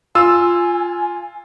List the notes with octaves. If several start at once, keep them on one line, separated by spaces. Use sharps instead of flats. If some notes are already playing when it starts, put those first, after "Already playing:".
F4 G#5 E6